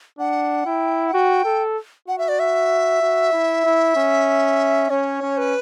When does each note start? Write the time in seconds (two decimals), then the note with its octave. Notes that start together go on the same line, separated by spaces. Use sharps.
0.19 D4 F#5
0.66 E4 G5
1.08 F#5
1.13 F#4 G5
1.45 A4
2.08 F#4 F#5
2.18 E5
2.29 D5
2.39 E5
3.02 F#4
3.33 E4
3.65 E4
3.96 C#4
4.90 C#4 C#5
5.22 C#4
5.38 B4